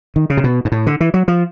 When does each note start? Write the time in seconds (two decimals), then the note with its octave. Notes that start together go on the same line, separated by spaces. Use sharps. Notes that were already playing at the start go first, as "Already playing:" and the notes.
0.16 D#3
0.30 C#3
0.37 C3
0.44 B2
0.65 G#2
0.72 A2
0.87 D3
1.00 E3
1.14 F#3
1.28 F3